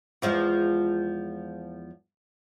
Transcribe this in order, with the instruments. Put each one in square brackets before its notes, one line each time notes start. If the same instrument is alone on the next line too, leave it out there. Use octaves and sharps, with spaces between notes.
[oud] E2 F3 G#3